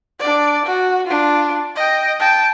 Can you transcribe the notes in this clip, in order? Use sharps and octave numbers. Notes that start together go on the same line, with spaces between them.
D4 D5
F#4
D4 F4
D#5 G5
G5 A5